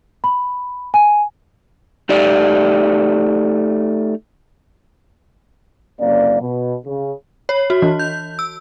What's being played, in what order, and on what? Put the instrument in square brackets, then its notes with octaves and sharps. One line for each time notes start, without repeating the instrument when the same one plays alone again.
[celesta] B5
G#5
[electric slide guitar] A3 D#4 G4 D5
[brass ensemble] F#1 C3 F#3 A#3 C#4 D5
B2
C#3
[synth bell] C#5
F#4
E3
G6
E6